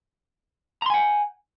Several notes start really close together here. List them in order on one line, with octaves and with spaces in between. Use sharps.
A#5 C6 G#5 F#5